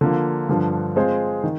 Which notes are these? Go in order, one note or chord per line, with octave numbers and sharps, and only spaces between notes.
D3 F3 A#3 F4
G2 D3 F3
G#3 C4 F4 G#4 C5
D#3